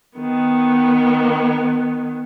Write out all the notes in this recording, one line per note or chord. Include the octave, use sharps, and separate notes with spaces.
D#3 B3